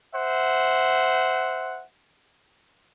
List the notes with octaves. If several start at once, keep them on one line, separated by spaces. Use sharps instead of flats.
C5 E5 F#5